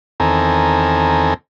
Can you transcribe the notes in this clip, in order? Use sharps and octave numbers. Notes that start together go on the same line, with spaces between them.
E2 D#3 C4 A4 G#5 A#5